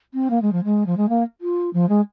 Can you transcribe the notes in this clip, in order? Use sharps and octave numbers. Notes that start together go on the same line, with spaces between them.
C4
A#3
G#3
F3
G#3
F3
G#3
A#3
F4
F3
G#3